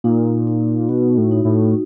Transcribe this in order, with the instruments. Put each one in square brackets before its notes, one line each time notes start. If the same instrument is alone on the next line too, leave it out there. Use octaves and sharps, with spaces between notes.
[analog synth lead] A#2 [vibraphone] D#4
[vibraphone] D#4
[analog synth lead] B2 [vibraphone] F#4
[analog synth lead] A2
[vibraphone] D#4
[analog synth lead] A2